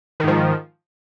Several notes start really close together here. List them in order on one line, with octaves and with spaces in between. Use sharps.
D#3 G#2 F3